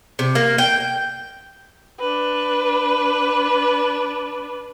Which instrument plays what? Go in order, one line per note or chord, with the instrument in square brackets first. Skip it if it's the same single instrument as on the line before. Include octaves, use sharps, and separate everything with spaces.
[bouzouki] C3
A#3
G5
[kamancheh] D4 B4